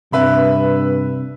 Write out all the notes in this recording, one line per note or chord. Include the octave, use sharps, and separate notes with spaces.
G2 C3 B4 E5 B5